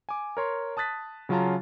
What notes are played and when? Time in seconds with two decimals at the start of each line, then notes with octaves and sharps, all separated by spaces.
0.09 G#5 D6
0.37 A#4 C#5 C6
0.77 A5 D#6 F#6 A6 B6
1.29 C#3 F#3 C#4 F4 A5 A#5